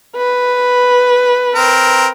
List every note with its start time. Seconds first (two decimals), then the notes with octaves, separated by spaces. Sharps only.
0.17 B4
1.55 C4 A#4